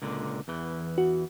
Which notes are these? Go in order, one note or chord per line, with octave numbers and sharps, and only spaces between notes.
C#2 A#2 D3
E2 E3
F#4